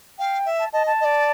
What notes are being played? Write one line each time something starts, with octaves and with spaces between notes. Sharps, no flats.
F5 G5
E5
A5
D#5 A5
A5
D#5
D5